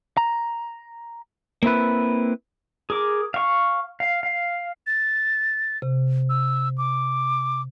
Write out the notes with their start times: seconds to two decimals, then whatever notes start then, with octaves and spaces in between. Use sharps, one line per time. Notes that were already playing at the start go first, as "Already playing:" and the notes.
0.17 A#5
1.63 A#3 C4 E4 B4
2.90 G#4 A#4 D6
3.34 F5 C#6
4.00 F5
4.23 F5
4.87 A6
5.82 C3
6.29 E6
6.78 D6